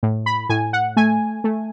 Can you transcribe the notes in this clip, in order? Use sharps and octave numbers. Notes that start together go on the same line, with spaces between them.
A2
B5
A2 G#5
F#5
A3 G#5
A3